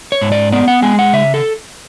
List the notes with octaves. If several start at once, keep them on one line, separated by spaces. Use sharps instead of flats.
C#5
G#2
D5
B3 D5
F#5
G#3 G#5
F#5
C#3 E5
A4